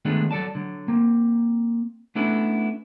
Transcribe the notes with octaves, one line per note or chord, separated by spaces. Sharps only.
D#3 F3 G#3 A3 B3 D4
F#3 A4 D5 A5
D3 F#3
A#3 C4
A3 B3 C#4 D4 E4 A4